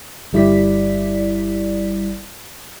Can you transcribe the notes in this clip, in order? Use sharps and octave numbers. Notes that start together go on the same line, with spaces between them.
G1 G3 E4 D5 B6